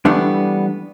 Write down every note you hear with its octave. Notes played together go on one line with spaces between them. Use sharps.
E3 G3 A3 B3 D4